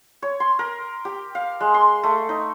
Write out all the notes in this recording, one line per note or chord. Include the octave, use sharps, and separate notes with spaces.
C#5
C6
A#4
G4
F5
G#3
C6
A3
D#4